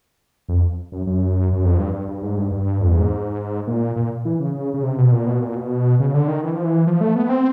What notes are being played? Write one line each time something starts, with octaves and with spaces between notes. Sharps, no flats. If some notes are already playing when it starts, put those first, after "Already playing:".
F2
F#2
F#2
F#2
F2
G2
G2
G2
G#2
G2
G2
F2
E2
G#2
A#2
A#2
E3
C#3
C#3
C3
B2
A#2
B2
A#2
B2
C#3
D3
D#3
E3
F3
E3
F3
A3
B3
C4